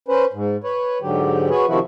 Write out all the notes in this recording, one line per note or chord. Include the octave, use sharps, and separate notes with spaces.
C#4 B4 C5
G#2
B4 C#5
G#2 D3 F#3 G4
F#4 G#4 B4 C#5
C3 D#3 F3 E4 F#4